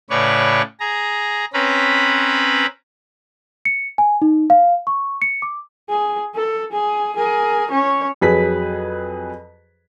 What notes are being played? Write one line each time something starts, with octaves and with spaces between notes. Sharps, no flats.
A2 C#3 B4 C#5 D5 C#6
G#4 A#5
C4 C#4 B4 A#5 B5
C#7
G#5
D#4
F5
C#6
C#7
D6
G#4
A4
G#4
G#4 A#4
C#4 C#5
F2 F#3 G#4 B4 B6